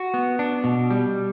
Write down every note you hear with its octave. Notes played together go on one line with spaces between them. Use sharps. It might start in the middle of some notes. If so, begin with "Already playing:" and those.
Already playing: F#4
B3
D4
B2
G3